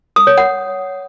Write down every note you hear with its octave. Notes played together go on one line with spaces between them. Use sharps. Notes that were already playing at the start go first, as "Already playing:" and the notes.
D#6
C#5
F#5